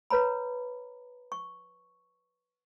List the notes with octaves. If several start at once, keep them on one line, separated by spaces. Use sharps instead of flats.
B4 C#5 A#5 B5
C#6